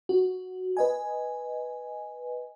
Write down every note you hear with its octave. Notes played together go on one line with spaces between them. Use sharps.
F#4
B4 D#5 G#5